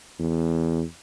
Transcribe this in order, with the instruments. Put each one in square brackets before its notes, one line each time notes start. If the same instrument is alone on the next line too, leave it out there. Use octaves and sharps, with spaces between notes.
[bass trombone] E2